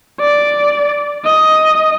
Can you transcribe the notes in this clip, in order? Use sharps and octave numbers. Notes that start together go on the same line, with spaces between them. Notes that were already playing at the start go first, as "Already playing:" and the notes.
D5
D#5